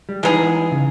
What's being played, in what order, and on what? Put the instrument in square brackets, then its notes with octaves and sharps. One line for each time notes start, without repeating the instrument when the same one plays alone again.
[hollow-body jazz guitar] G3
[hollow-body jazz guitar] E3 [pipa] G#3 B3 D#4 G#4
[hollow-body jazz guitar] C#3